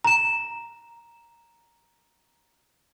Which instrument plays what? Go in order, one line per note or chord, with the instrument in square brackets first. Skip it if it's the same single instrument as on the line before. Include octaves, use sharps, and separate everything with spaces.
[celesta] A#5 E7